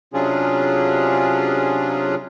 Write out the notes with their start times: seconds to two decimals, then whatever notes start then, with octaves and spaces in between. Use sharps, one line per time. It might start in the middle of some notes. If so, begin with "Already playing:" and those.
0.13 C3 F#3 C#4 D4 F4 G#4